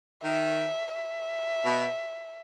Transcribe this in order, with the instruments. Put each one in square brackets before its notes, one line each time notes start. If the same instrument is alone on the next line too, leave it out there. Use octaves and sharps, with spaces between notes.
[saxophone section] D#3 [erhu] E5
[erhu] E5
[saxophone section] B2